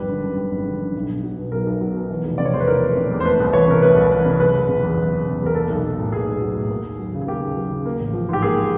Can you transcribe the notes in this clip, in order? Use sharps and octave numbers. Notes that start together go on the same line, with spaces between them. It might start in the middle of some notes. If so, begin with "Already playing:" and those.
Already playing: G#1 F2 G3 B4
D3
F#2
G3
G#1
D3
F#2
B1
B1
F#3
B2
B1 A#4
B1
F#3
B2
E3
F1
C3 D5
C#5
E2 C5
B4
E3 A#4
F1
C3
E2
C5
A3 B4
C2
E3 C#5
C3 A#4
A3 B4
C2
E3 B4
C3
F#1 B4
F#1
C3
E2
F#1
F#1
C3
E2
A#4
A#3 A4
B1
F#3
A2
A#3 G#4
B1
F#3
A2
A#3
D#2
F#3
C#3
G#4
A#3 G4
D#2
F#3
C#3
A#3
A1
F3
G#2 G4
A#3 G#4